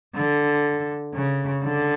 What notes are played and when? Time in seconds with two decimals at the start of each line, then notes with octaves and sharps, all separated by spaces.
0.16 D3
1.14 C#3
1.63 D3